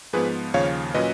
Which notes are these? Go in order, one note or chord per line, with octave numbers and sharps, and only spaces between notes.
G#2 F3 B3 G#4 B4
D#2 C#3 F3 C#5 F5
A#2 F#3 C#4 B4 D#5